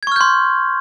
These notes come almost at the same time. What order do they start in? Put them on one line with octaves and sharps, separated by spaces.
G#6 C#6 F6 G6 C6